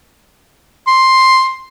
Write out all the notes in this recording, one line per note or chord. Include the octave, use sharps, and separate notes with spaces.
C6